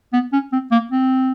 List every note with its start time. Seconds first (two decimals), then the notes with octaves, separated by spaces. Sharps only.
0.13 B3
0.33 C#4
0.53 C4
0.72 A#3
0.92 C4